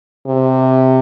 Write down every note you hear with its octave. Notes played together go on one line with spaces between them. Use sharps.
C3